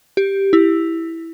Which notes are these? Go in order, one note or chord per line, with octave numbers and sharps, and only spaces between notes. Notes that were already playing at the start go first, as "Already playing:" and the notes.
G4
E4